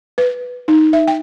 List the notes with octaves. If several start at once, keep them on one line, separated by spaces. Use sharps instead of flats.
B4
D#4
E5
G5